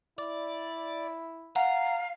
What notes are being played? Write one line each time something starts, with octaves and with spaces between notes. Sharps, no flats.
E4 D5
F5 F#5 A#5